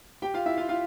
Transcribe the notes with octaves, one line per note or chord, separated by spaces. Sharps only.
G4 G5
F4 F5
E4 E5
F4 F5
F4 F5